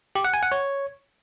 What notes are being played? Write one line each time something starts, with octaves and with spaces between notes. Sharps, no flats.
G4
F#5
G#5
F#5
C#5